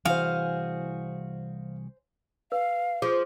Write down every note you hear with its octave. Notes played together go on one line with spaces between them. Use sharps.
C2 E3 F#4 G#4 C5 F5 G#5
B4 F5
F3 G#4